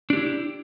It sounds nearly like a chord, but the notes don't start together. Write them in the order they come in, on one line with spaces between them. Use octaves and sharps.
D4 G4 E4